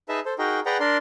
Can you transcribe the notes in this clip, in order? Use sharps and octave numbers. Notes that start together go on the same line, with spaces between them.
D#4 G#4 B4 D#5 E5 A5
A4 C5
D#4 F#4 G#4 A#4 G5
G#4 B4 D5 F#5 G5 A#5
D4 A#4 D5 C6